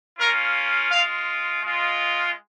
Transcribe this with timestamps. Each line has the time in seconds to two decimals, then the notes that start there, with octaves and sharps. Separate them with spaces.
0.18 A#3 C#4 F4 A#4
0.90 G#3 F4 F5
1.62 G#3 F4